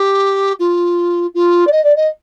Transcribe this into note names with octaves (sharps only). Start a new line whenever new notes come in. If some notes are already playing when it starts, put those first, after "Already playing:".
Already playing: G4
F4
F4
D5
D#5
D5
D#5